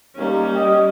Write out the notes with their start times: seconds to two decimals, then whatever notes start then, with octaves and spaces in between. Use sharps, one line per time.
0.16 D#2 G3 A#3 C#4
0.54 D#5 G5